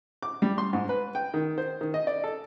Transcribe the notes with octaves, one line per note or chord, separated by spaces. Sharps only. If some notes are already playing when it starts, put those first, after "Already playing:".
D6
G3
C6
G#2
B4
G5
D#3
C5
D#3
D#5
D5
A4